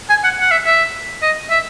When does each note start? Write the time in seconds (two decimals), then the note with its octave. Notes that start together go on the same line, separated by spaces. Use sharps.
0.09 G#5
0.24 F#5
0.41 F#5
0.51 E5
0.66 E5
1.22 D#5
1.50 E5